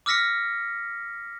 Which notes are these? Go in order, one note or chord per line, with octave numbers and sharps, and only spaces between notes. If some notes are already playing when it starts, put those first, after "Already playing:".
D6 E6 F6 A#6 B6 C#7